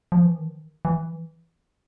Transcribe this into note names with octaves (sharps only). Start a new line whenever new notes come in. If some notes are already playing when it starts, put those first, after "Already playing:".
F3
E3
D#3
E3